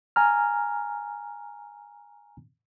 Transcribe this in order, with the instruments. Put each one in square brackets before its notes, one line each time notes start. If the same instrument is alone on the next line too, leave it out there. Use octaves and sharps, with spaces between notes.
[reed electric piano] G#5 A#5 F6